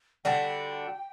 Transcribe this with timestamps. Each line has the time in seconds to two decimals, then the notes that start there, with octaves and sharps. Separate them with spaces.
0.25 D3 G3 D4 F#4 G5